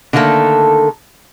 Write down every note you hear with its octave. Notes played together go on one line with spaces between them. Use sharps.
D3 D#3 A3 A#3 A4